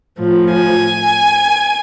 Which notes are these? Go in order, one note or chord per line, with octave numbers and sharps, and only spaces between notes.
A2 F3
G#5